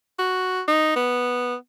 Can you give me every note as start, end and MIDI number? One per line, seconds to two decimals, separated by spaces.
0.19 0.62 66
0.68 0.93 63
0.96 1.55 59